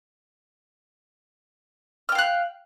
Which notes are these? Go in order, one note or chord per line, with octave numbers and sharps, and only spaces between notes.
F5 G5 F6 F#6